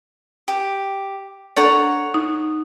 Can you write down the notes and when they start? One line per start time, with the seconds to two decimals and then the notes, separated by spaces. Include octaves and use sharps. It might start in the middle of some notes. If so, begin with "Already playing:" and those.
0.48 G4
1.57 D4 A4 C#5 D5 F#5 A#5
2.14 D#4